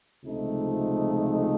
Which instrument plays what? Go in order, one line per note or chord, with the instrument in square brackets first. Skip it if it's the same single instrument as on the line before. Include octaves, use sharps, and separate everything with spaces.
[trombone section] C#2 C3 F3 A3 D#4